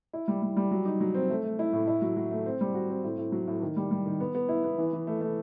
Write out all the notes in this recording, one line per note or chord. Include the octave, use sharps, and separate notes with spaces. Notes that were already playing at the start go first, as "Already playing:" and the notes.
E4
G3
G3
G3
F#3
D#4
F#3
C4
A3
A3
E4
A2
E4
F#3
F#3
A3
C4
G3
F#4
C4
A2
A2
F#3
A2
D#3
G3
G3
D#3
B3
B3
E4
B3
E3
E3
A3
A3